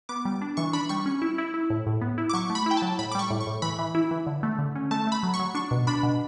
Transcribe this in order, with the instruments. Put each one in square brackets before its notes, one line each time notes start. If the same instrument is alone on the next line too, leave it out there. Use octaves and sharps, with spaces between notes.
[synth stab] B3 D6
G3
D4
E3 C#6
D4 B5
G3 C#6
C#4
E4
E4
E4
A2
A2
B3
E4
D6
F#3 C#6
A3
B5
E4 G5
F#3 A5
A2 B5
D6
G3 C#6
A2
C#6
A2
E3 B5
E3
E4
E3
D3
A3
D3
C#4
A3 A5
A3 B5
F#3
C#6
F#3
D4 C#6
B2
D4 B5
B2